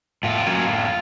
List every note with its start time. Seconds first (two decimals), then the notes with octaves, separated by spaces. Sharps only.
0.23 A2 F4
0.46 F#3 A#3 C#4
0.68 A2